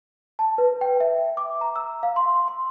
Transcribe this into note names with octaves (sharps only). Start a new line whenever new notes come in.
A5
B4
G5
E5
D6
A#5
E6
F5
C6
C6